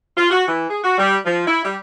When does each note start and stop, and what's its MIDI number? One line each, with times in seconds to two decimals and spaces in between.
0.17 0.29 65
0.30 0.43 66
0.47 0.67 52
0.70 0.81 68
0.83 0.95 66
0.98 1.17 55
1.26 1.44 53
1.47 1.61 64
1.64 1.76 55